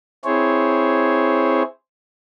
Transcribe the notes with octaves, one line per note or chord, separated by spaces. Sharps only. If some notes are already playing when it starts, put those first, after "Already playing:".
C4 E4 G#4 C5 C#5